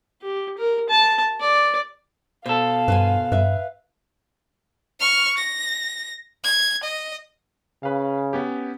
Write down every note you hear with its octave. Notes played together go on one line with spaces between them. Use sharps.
G4
A#4
A5
D5
B2 A4 C5 F5
G2 B4 C5 G#5
G2 B4 E5
C#6 F6
A#6
G#6
D#5
C#3 B4 F5
B3 C#4 G4